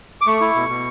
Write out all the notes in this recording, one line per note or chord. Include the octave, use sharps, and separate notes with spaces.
D6
A3 C#6
E4
B2
B2